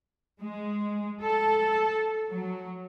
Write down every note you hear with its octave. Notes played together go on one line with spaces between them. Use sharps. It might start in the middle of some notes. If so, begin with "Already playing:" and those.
G#3
A4
F#3